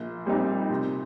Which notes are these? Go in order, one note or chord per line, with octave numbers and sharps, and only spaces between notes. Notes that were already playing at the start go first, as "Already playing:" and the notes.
Already playing: A#1
A#2 G3 C4 D#4
C3